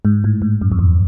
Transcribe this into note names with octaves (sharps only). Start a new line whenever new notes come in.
G#2
A2
G#2
F#2
F2
E2